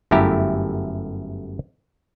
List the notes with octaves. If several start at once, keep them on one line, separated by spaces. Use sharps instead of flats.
G1 F#2 A3 E4 G4 A#5